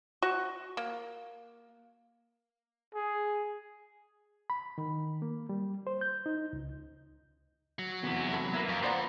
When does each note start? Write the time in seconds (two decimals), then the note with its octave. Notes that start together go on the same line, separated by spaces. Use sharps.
0.22 F#4 C#6
0.77 A#3
2.94 G#4
4.50 B5
4.78 D#3
5.22 A#3
5.49 G3
5.87 C5
6.01 G6
6.26 D#4
6.53 C#2
7.79 F#3
8.04 E2 C3 B3 E4
8.33 A4 B5
8.54 A#3 B3 E4
8.69 F2 C#5
8.83 F4 B4 C5 D5 F#5 A#5 B5